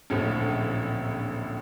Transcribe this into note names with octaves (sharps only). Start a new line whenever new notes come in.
D1 A#1 A2 D3 F3 C#4